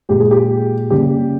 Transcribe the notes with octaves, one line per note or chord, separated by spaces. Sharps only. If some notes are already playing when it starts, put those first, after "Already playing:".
A#2 G#3 G4
G#4
G4
C#3 G3 A#3 G4